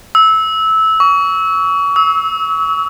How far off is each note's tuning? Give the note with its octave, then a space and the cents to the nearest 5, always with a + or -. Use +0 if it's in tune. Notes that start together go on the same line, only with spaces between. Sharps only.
E6 -15
C#6 +35
E6 -30